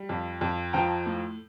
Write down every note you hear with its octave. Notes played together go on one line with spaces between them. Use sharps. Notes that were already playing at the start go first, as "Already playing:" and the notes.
Already playing: G3
F2
F2
F3 G5 A#5
A2